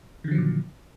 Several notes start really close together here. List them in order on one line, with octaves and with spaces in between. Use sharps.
D#3 D3 F3 F#3 A#2